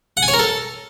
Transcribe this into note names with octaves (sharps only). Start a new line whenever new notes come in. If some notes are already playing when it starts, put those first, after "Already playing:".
F#5
G#5
C#5
A#4
A4